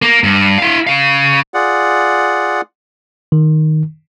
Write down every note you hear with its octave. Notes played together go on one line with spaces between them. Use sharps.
A#3
G2
E4 F5
C#3 F5
F4 G#4 D5 F#5
D#3